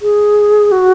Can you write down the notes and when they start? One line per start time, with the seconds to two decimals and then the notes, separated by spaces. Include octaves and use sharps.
0.02 G#4
0.72 F#4